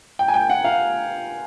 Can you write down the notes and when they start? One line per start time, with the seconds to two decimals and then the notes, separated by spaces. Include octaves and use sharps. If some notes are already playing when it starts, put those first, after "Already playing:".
0.19 G5
0.28 G#5
0.34 G5
0.50 F#5
0.64 F5